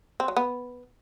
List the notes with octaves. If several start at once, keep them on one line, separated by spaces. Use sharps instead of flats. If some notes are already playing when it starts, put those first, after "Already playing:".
C4
F#3
B3